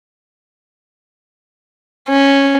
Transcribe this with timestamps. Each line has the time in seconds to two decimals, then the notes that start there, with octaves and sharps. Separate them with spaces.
2.09 C#4